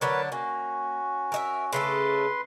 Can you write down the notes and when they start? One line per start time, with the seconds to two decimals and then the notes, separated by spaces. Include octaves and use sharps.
0.01 D3 F#3 D4 A#4 B4 C#5
0.32 A#3 C#4 F#4
1.32 A#4 D#5 E5
1.72 C#3 A3 A4 B4 C6